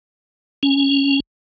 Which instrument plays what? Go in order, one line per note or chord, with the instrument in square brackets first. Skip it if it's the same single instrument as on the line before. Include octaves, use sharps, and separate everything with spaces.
[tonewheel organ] C#4